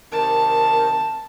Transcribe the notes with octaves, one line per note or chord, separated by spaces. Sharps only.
C3 D#3 A#4 A5